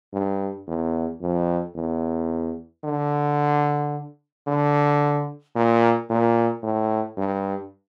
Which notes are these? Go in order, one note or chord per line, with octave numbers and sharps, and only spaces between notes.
G2
E2
F2
E2
D3
D3
A#2
A#2
A2
G2